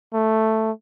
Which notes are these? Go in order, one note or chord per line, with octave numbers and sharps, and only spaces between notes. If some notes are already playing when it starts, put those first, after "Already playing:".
A3